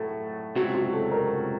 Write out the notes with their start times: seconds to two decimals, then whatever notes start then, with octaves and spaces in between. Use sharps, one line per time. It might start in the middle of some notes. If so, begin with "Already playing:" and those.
Already playing: A2 F#3 A3 A4
0.56 C#2 C3 F#3 A3 F#4
0.75 F#4
0.93 A4
1.12 A#4